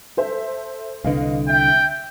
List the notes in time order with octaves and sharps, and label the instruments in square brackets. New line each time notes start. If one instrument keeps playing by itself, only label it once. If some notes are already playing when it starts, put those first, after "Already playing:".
[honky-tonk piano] A4 C5 E5
[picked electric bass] C2 D3 [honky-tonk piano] B4 D#5 F5
[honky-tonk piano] E5 [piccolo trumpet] G5